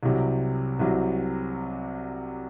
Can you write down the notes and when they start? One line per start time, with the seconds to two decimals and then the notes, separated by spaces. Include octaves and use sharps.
0.03 C2 C3 F#3
0.79 C2 C3 F#3